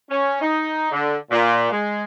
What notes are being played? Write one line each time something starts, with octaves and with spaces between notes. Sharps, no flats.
C#4
D#4
D3
A#2
G#3